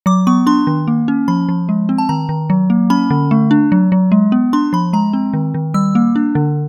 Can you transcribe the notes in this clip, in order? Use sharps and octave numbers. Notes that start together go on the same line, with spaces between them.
F#3 D6
B3 C#6
D4 C6
D#3
A#3
C#4
F3 B5
F3
G#3
C4
A5
D#3 A#5
D#3
F#3
A#3
C#4 B5
D3
A3
D4
F#3
F#3
G#3
B3
D4 C6
F3 B5
G#3 A#5
C4
D#3
D#3
G3 E6
A#3
D4
D3